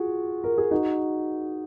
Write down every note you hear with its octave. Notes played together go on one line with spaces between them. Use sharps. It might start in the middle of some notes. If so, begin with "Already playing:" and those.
Already playing: F4 F#4 G#4
A#4
G#4
D#4 F#4